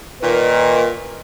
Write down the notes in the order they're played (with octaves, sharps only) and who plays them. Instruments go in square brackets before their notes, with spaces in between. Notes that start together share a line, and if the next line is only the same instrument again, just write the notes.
[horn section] A#2 D#3 [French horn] B4